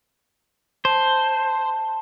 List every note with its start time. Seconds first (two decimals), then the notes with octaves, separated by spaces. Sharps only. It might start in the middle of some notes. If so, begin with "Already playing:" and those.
0.85 C5 A5